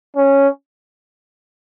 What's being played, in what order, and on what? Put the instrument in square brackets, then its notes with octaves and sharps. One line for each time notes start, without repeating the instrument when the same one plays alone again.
[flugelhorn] C#4